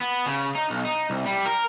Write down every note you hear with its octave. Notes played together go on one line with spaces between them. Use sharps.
B3
C#3
D#4
B1
D#4
C2
G3
A#4